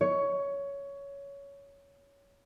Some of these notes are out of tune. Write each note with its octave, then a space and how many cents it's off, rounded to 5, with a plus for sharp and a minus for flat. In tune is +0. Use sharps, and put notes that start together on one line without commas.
C#5 +15